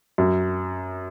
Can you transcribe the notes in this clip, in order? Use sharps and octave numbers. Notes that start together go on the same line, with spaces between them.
F#2